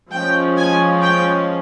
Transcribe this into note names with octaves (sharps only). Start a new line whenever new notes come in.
F3 G#3 C#4 G5
G#5
G5